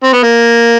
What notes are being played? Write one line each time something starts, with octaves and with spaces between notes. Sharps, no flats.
C4
B3
A#3